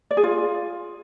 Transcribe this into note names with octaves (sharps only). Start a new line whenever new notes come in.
D5
G#4
F4